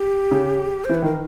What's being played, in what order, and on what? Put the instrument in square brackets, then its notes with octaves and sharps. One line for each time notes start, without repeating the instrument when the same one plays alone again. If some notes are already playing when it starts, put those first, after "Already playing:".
Already playing: [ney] G4
[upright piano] C#3
[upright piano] E3 [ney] C5
[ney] B4
[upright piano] D#3 [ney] A#4